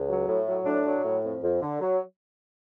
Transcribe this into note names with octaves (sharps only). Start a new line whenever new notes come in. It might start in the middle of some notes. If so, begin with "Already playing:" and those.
Already playing: C#2
F#3
A2
F#3
A2 D4
F#3
A2
F2
F2
D3
F#3